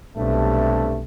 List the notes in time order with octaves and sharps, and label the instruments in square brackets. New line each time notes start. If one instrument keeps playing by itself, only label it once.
[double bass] B1 [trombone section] G2 C3 A3